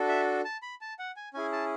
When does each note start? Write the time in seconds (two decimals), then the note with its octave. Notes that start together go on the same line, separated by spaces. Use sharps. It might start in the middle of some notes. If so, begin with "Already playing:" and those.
Already playing: D4 F#4 A4
0.08 E5
0.45 A5
0.62 B5
0.81 A5
0.99 F#5
1.16 G#5
1.34 C#4 E4 G#4 G#5
1.52 A5